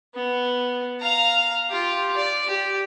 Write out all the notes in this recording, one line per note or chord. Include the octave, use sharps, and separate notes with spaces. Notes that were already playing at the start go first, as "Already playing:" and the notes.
B3
F5 A#5
F4 G4
D5
G4